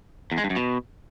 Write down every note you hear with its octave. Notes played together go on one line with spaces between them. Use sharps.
E2
G#3
G2
F#2
B2